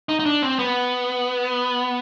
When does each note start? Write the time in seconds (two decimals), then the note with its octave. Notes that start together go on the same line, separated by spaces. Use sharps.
0.09 D#4
0.19 D#4
0.26 D4
0.42 C4
0.59 B3